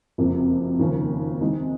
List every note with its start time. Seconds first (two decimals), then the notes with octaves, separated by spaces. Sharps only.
0.18 F#1 F2 C3 F3 A#3
0.79 D#2 C#3 F3
1.41 C3 D#3 G#3